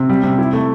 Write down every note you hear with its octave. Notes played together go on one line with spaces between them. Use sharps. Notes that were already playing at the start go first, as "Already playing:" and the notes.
Already playing: C3
G3
C3
E4
A3